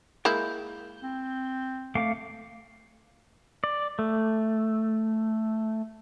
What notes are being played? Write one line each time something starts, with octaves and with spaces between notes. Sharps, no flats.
G#3 A#3 E4 G6
C4
A3 F5 D6
D5
A3